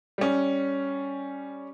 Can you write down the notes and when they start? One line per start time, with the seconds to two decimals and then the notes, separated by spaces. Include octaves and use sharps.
0.18 G3 C#4